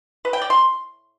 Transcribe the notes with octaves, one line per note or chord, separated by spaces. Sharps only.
B4
G5
D5
C6